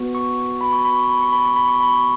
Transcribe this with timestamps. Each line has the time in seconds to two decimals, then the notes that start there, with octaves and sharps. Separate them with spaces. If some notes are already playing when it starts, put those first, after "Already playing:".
Already playing: B3 F#4
0.15 C#6
0.61 B5
0.73 C#6
0.85 B5
0.96 C#6
1.09 B5
1.21 C#6
1.33 B5
1.45 C#6
1.56 B5
1.68 C#6
1.81 B5
1.92 C#6